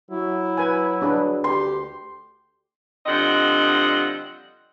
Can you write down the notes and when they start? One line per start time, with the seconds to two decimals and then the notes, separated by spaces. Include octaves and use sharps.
0.11 F#3 E4
0.58 B4 G#5
1.02 D4 G#4 B4
1.44 D2 G4 C6
3.06 D3 F3 G3 C4 D#5 F#5